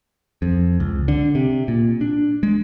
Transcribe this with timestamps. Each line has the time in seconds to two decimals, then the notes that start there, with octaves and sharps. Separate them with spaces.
0.42 F2
0.80 C#2
1.08 D3
1.35 C3
1.68 A#2
2.01 D4
2.43 G#3